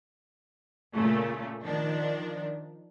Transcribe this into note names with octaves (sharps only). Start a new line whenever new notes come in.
A#2 C#3 A3
D#3 F3 D4